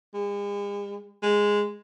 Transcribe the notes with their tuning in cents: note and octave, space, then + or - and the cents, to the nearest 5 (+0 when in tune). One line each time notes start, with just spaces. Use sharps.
G#3 -45
G#3 -5